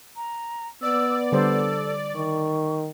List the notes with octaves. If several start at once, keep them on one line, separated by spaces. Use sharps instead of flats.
A#5
B3 D5 E6
D3 G3 A4 C5
D#3 C#6